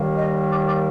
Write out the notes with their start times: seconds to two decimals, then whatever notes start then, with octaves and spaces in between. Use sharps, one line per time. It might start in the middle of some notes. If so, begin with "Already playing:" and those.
Already playing: D#2 D#3 G3 A#3
0.17 D#5
0.51 D5
0.67 D5